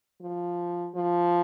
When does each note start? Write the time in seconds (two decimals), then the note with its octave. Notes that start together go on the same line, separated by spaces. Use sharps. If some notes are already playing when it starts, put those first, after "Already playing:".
0.22 F3
0.95 F3